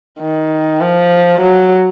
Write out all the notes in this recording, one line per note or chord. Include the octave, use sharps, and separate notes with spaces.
D#3
F3
F#3